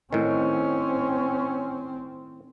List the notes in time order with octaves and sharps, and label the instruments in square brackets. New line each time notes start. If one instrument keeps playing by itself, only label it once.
[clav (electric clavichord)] A2 D#3 [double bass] C4 [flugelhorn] C#4